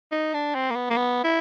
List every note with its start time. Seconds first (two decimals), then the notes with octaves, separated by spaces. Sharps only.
0.12 D#4
0.34 D4
0.55 C4
0.70 A#3
0.75 B3
0.90 A#3
0.97 B3
1.24 E4